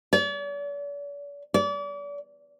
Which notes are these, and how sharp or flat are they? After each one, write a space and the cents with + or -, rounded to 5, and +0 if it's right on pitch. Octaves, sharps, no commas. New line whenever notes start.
D5 -45
D5 -35